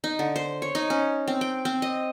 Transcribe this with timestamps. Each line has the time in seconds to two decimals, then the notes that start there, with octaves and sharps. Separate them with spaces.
0.04 D#4
0.19 D3
0.36 C5
0.62 C#5
0.75 D#4
0.90 C#4
1.28 C4
1.41 G5
1.65 C4
1.82 D#5